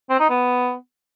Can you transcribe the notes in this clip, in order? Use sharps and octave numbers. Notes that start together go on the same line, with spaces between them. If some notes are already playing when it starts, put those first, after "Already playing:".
C4
D#4
B3